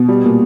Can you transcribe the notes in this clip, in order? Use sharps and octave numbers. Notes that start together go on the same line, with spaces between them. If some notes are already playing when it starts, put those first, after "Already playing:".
Already playing: B2
G3
A#2